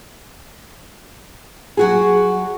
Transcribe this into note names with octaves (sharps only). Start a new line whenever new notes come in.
F#3 F#4 G#4